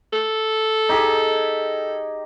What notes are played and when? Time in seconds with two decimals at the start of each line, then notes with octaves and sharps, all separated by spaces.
0.13 A4
0.89 D#4 G4 G#4